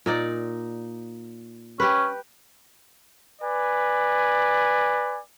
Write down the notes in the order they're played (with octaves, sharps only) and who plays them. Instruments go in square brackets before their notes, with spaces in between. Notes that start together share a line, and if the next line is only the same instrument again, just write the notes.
[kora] A#2 D#4 D5
[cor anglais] C#4 [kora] G4 B4
[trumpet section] B4 D5 G#5